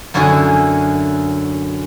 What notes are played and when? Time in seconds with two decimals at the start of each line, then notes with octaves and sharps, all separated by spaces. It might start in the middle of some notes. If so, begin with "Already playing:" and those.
0.14 F#2 D3 C#4 E4 F#4 G#4